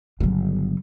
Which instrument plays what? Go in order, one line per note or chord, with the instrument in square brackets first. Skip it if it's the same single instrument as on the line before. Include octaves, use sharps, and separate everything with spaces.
[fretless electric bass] G1 [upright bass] C#3 F#3